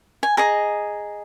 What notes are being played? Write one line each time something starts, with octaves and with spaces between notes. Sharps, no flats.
G#5
G#4 D#5 A#5